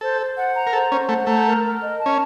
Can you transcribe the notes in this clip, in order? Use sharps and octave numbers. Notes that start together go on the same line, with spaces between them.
A4 C5
C5
F#5
A#5
A#4
A4 C5
C#4 C5
A3 F#5
A3 A#5
A#4
A#4
D#5
A5
C#4